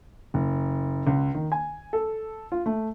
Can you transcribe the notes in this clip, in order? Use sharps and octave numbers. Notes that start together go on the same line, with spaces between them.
F#1
C#2
D#3
G#5
A4
F4
A3